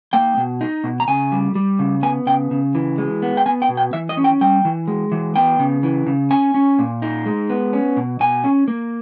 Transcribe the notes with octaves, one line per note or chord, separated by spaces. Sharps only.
A#3 G5
B2
D#4
B2
A#5
C#3 G#5
G3
G3
C#3
B3 G#5
C#3 G5
C#3
E3
G#3
B3
G5
B3 G#5
G5
B2
G5
E3 E5
D#5
C#4
G5
G3 G5
E3
G#3
E3
B3 G5
C#3
E3
C#3
C#4 G#5
C#4
A#2
D#4
G#3
B3
C#4
B2
B2 G#5
C#4
A#3